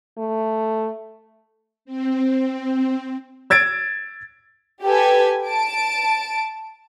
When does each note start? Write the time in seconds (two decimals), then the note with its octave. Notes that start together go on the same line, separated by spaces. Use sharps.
0.18 A3
1.85 C4
3.50 E6 G#6 A6 D7
4.84 G4 A4 B4 G#5
5.48 A5 D7